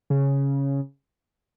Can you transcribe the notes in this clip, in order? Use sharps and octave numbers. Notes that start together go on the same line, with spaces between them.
C#3